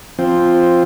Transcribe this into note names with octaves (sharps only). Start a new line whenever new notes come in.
F3 C4